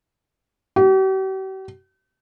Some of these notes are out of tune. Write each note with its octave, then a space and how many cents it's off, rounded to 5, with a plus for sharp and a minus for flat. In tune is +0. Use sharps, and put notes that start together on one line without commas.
G4 -45